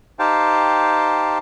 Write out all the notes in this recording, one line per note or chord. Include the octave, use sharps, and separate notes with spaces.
D#4 G4 C5 F5 G5 A5